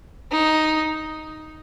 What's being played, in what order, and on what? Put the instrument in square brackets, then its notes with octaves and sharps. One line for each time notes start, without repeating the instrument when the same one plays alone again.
[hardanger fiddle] D#4